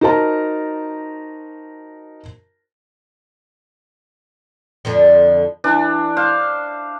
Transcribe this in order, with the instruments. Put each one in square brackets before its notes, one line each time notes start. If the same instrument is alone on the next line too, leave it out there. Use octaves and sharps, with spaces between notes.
[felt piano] D#4 F#4 A#4 C5 A5 A#5
[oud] F2 D3 F3
[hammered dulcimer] E3 D4
C5 F5